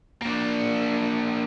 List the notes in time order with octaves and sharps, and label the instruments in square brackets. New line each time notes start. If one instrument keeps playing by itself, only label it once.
[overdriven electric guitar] A#3 D4